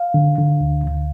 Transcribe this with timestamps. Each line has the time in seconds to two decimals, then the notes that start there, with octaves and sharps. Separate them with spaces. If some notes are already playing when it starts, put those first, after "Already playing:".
Already playing: F5
0.14 D3
0.38 D3
0.61 D2
0.84 D2